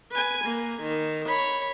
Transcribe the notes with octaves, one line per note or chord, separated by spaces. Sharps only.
B4 G#5
A#3
D#3
C#5 B5